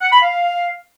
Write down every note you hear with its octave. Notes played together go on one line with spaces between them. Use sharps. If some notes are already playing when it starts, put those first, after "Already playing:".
F#5
B5
F5